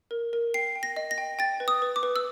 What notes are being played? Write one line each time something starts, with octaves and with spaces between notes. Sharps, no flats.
A#4
A#4
G5 C7
G5
A#6
D#5
A#6
G5
G5 A6
B4
D#6
B4
D6
B4
E6